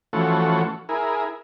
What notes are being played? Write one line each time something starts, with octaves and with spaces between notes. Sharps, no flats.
E3 F3 A3 C#4 F#4 A4
E4 G#4 A#4